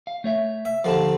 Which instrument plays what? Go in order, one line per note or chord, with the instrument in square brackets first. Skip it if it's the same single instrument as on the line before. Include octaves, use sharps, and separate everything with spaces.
[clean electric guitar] F5
A3 C#5 E5
[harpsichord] E5
[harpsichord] D#2 D3 F3 [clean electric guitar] F5 A5